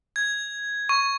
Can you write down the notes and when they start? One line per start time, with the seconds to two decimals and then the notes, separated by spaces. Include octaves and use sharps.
0.16 G#6
0.89 C#6